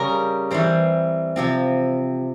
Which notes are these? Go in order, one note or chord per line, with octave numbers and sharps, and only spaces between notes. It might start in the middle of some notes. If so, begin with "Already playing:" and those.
Already playing: C#3 G3 C#4 G4 A#4
E3 G3 C4 C5
C3 F3 C4